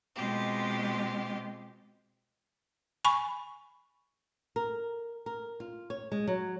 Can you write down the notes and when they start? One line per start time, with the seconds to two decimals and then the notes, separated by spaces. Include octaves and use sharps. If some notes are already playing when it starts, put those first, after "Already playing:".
0.16 B2 G#3 C4 F4 G4
3.05 G#5 B5 C#6
4.56 A#4
5.26 A#4
5.60 F4
5.90 C#5
6.12 G#3
6.27 F#3